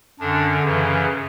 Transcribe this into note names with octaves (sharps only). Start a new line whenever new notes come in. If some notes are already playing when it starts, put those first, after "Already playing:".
F#2 D3 D4
F#2 C#3 E3